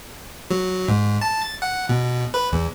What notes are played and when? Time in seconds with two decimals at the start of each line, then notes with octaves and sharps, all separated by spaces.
0.50 F#3
0.88 G#2
1.21 A5
1.42 A6
1.62 F#5
1.89 B2
2.34 B4
2.52 E2